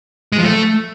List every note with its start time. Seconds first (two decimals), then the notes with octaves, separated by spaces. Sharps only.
0.32 G#3
0.38 F3
0.44 A3